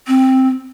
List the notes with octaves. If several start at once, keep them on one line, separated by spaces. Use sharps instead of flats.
C4